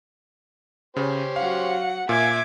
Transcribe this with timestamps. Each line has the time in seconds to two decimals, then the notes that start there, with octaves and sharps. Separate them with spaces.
0.96 C#3 C#4 G4 C5
1.36 F#3 F5 F#5
2.09 A#2 E5 F5 G#5 D6 G#6